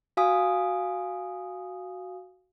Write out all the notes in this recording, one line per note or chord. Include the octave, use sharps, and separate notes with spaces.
F#4 F5 G#5 D#6